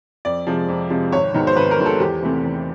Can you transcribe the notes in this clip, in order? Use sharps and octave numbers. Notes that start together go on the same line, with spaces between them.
F2 D5
C3 F3 G#3
F2
C3 F3 G#3
G#1 C#5
G#2 D#3 F#3 B3
C5
G#1 B4
A#4
G#2 D#3 F#3 B3
A4
E2 G4
C3 E3 A3 C4
E2